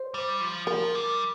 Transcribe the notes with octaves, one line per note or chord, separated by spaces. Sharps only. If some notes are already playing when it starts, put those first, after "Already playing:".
Already playing: C5
G3
F3
F3 A#4
G3